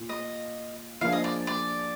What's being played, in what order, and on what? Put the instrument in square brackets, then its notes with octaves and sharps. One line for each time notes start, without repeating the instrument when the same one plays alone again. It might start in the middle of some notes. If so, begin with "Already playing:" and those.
Already playing: [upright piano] A#2 F4
[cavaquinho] D#5
[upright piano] F3 A#3 D4 G#4 [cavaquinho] F5
[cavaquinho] D#5
D5
D5